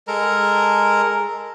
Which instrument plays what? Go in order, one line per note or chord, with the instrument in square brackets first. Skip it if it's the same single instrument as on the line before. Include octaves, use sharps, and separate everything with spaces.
[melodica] G#3 A4 A#4 A#5